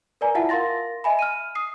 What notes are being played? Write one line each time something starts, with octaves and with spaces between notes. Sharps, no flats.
A#4 B4 D5 G#5 A#5
E4 F4 E5 F#5 A5
A#4 F5 C6 A6 A#6
D#5 E5 G#5 B5
F6 D#7
D#6 C7